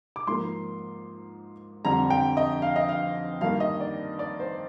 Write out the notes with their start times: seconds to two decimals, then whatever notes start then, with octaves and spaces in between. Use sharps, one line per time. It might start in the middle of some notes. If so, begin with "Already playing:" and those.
0.16 D6
0.27 G#2 F3 A#3 C6
1.85 F2 D3 G3 A#5
2.10 G5
2.37 D#5
2.62 F5
2.76 D#5
2.89 F5
3.41 G2 D#3 A#3 F5
3.60 D#5
3.80 D5
4.19 D5
4.40 C5